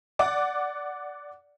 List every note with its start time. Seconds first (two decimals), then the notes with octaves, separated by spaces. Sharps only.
0.19 D5 F#5 D6